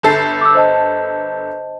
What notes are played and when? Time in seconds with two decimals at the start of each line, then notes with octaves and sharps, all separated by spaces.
0.03 G1 A4 C7
0.41 D6 E6
0.55 C5 D#5 A5